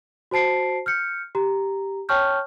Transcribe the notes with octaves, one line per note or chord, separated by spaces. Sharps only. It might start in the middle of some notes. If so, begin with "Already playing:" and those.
F#4 C5 A5 C7 D7
F6 G6 C#7
G4 A#5
C#5 G5 A5 C#6 F6 G6